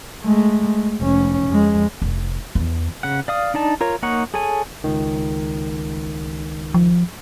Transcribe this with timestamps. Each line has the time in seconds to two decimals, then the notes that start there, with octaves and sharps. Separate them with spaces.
0.22 G#3 A3
1.00 F1 C#4
1.48 F2 G#3
2.02 F1
2.55 E2
3.03 C#3 F#5
3.28 D5 F5 D#6
3.54 D4 D#4 D5 A5
3.81 F4 A#4 C#5
4.03 A#3 D#4 C#5 F#5 C#6
4.34 G#4 A4 C#5 G#5
4.84 C#2 D#3
6.74 F3